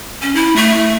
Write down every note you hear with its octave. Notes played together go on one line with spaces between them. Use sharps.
C#4
E4
A3